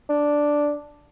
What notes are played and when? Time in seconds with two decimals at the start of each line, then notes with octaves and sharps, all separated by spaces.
0.09 D4